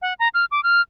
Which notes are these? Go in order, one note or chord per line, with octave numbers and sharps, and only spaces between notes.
F#5
A#5
F6
D6
F6